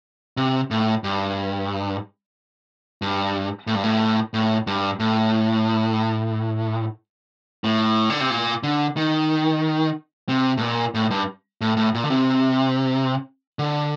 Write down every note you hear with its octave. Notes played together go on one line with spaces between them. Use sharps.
C3
A2
G2
G2
A2
G2
A2
A2
G2
A2
A2
D3
C3
A#2
D3
D#3
C3
A2
A#2
A2
G2
A2
A2
A#2
D3
C3
D3